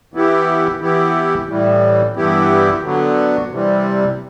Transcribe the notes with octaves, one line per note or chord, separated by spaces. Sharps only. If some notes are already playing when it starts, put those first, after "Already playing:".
E3 B3 E4 G4
E3 B3 E4 G4
A2 E3 G3
G2 E3 B3 E4 G4
D3 F#3 B3
C3 E3 G3